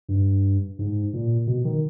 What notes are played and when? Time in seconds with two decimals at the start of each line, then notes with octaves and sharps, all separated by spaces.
0.09 G2
0.79 G#2
1.13 A#2
1.47 B2
1.65 D#3